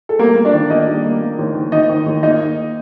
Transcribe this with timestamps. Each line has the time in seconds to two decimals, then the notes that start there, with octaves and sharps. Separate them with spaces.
0.09 A4
0.19 G3 A#3 A#4
0.36 A#3
0.45 D4 D5
0.53 D#3
0.70 A#3 D#4 D#5
0.87 G3
1.05 A#3
1.21 A#3
1.39 D#2
1.55 D#3
1.72 D#3 D#4 D#5
1.89 D#3
2.06 D#2
2.23 A#3 D#4 D#5